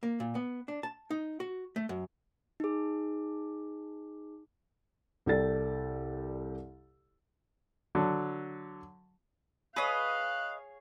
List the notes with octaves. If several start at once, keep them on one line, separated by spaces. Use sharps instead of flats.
A#3
A#2
B3
D4
A5
D#4
F#4
A3
F#2
D#4 G#4
C2 G4 A4 D5 A6
D3 F#3
G#4 B4 C#5 D#5 F5 F#6